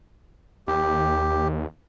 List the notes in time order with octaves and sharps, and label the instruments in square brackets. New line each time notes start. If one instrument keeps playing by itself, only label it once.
[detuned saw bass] D#2 [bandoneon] G4